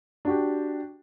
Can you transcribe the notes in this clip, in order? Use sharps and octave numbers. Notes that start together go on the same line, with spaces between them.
D4 F#4 G4